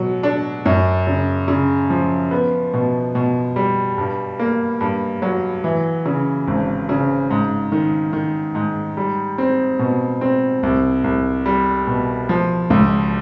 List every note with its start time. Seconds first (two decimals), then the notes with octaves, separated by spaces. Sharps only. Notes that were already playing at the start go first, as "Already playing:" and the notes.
Already playing: B2 F#3
0.23 D4
0.66 F#2
1.07 C#3
1.48 C#3
1.90 F3
2.31 B3
2.74 B2
3.15 B2
3.56 G3
3.98 G2
4.39 A#3
4.81 G2
5.22 F#3
5.64 E3
6.06 C#3
6.48 G#1
6.89 C#3
7.30 G#2
7.72 D#3
8.13 D#3
8.55 G#2
8.97 G3
9.38 C4
9.79 B2
10.21 C4
10.63 C2
11.04 C2
11.46 G3
11.87 B2
12.29 F3
12.70 C#2